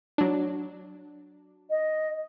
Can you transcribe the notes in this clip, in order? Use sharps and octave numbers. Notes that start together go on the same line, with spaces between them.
F#3 D4
D#5